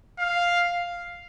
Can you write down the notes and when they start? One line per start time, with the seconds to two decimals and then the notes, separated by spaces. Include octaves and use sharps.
0.19 F5